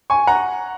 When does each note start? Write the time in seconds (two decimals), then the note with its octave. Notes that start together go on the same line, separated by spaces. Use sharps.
0.10 G#5 C#6
0.27 F#5 A#5